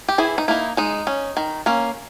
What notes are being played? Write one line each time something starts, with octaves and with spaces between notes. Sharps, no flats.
G4
E3 E4 G#4
D#4
A#3 D#4 E4
G#3 D#4
C#4
D#3
A#3 C#4